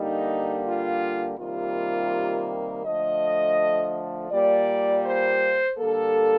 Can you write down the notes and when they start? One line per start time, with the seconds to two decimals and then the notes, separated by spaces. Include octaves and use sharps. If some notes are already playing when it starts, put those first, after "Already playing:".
Already playing: D3 G3 A#3 D#4
0.65 F4
1.38 C3 D#3 G3 A#3 F4
2.85 D3 F3 A3 D#5
4.31 A#2 G3 A#3 D5
5.04 C5
5.77 D3 G3 A#3 A4